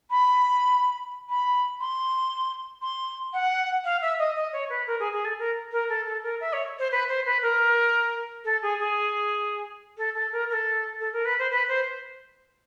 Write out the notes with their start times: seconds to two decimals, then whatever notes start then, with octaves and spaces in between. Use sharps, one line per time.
0.10 B5
1.29 B5
1.80 C6
2.82 C6
3.33 F#5
3.84 F5
4.02 E5
4.19 D#5
4.36 D#5
4.53 C#5
4.69 B4
4.87 A#4
4.99 G#4
5.13 G#4
5.25 A4
5.38 A#4
5.72 A#4
5.89 A4
6.06 A4
6.23 A#4
6.40 E5
6.53 C#5
6.79 C5
6.91 B4
7.08 C5
7.25 B4
7.42 A#4
8.45 A4
8.62 G#4
8.79 G#4
9.98 A4
10.15 A4
10.32 A#4
10.49 A#4
10.53 A4
11.00 A4
11.13 A#4
11.25 B4
11.38 C5
11.51 B4
11.68 C5